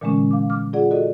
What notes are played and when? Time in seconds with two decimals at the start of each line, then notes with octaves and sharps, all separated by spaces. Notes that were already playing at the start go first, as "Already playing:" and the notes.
0.01 A#2 D3 E3 G#3 A3 C#4
0.31 F5 D6
0.50 D6 F6
0.73 F4 G#4 D5 F#5
0.91 F#4 A4 D5 D#5